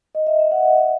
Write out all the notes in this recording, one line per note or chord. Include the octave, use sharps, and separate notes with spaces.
D#5
E5
E5
F#5
D#5
E5